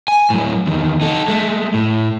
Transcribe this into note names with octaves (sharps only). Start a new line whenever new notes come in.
G#5
A2 F#3
E2 D#3
D#4 A4
G#3 A3
A2